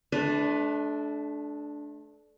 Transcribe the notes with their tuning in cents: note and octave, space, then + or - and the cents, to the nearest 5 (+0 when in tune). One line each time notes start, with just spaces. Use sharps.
A3 -30 D4 +0 B4 +15